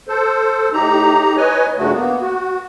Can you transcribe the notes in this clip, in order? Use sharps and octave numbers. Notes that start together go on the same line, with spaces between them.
A4 C5
A2 D#4 G4 A#5
B4 C#5 D#5 G#5
G2 A#2 C#3 A3 F#4
A#3 B3
F#4